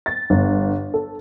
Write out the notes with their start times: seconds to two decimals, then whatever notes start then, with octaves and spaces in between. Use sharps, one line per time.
0.06 A6
0.30 G1
0.94 A4